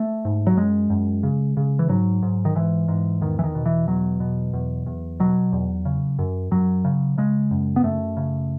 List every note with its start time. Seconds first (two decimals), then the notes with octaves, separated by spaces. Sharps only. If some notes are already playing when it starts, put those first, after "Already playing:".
Already playing: A3
0.25 G#2
0.47 F#3
0.57 F#2 G#3
0.90 F#2
1.23 C#3
1.57 C#3
1.79 E3
1.89 G#2 F#3
2.23 G#2
2.45 D#3
2.55 G#2 E3
2.88 G#2
3.21 E2 D#3
3.39 E3
3.44 D#3
3.55 B2
3.66 E3
3.87 E2 F#3
4.20 B2
4.54 E2
4.86 E2
5.20 B2 F#3
5.53 E2
5.85 C#3
6.19 F#2
6.51 F#2 F#3
6.85 C#3
7.18 C#3 G#3
7.51 F#2
7.76 B3
7.84 F#2 A3
8.17 C#3